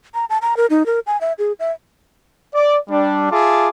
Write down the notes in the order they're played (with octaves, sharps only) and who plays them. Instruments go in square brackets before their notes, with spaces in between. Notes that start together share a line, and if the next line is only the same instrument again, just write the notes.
[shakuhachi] A#5
A5
A#5
A#4
D#4
A#4
G#5
E5
G#4
E5
[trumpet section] D5
G3 D4
F4 G#4 E5 A5 D6